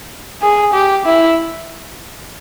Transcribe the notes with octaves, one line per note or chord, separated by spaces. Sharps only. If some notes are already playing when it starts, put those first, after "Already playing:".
G#4
G4
E4